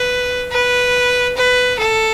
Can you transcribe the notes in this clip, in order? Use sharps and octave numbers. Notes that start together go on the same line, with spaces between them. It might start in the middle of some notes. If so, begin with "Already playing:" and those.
Already playing: B4
B4
B4
A4